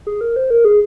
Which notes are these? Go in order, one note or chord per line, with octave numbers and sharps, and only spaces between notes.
G#4
A#4
C5
A#4
G#4